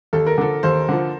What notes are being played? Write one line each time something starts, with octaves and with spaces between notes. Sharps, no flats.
D#2 A4
A#4
D3 F3 A4
D#2 C5
D3 F3